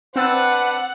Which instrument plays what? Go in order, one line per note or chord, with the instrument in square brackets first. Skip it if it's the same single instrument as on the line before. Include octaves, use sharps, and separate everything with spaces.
[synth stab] C4 E6 A6 [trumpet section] D4 B4 [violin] F#5